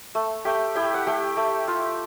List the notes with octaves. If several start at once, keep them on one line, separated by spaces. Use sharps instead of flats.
A3
A3 G4 G5
E4 G4 G5
F#5
A3 G4 G5
A3
F4